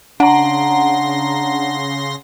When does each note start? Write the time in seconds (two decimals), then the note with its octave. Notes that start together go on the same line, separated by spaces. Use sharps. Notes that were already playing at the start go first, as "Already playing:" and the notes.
0.20 C#3 D4 F#5 A#5 C6 A#6